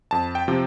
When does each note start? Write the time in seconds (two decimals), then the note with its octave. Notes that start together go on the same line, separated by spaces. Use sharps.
0.11 F2 A5
0.35 G5
0.48 C3 F3